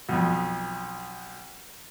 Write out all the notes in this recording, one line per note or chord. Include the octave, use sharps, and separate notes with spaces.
B1 F2